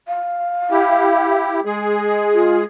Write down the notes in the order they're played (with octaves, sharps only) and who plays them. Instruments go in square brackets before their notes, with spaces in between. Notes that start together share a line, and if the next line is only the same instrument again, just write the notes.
[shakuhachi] F5
[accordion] E4 G4
G#3 G#4
[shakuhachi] F4